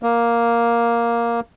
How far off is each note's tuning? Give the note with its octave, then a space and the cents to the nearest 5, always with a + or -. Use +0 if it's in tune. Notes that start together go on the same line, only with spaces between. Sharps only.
A#3 +5